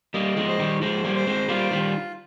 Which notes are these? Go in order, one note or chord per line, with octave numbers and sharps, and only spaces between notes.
G3 A#3 D#5
F3 G#3
C5
D#3 G3
F3 G#3 C5
G3 A#3
C5
G#3 C4
G3 A#3 F4
D#3 G3